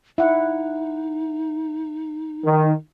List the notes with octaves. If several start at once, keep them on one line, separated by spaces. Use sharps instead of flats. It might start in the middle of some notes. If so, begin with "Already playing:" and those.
D#4 E4 F#5
D#3